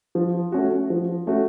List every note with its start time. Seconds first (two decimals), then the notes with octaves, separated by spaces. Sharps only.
0.15 F3
0.52 A3 C#4 F#4
0.90 F3
1.27 A3 C#4 F#4